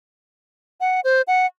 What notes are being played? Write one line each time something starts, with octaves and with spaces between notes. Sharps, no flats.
F#5
C5
F#5